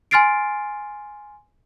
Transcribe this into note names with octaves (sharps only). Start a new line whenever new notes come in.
G#5 C6 F6 A6 C7 D7